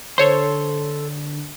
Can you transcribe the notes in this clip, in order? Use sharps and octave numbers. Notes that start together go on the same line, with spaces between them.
D3 A4 C5 C#5 C6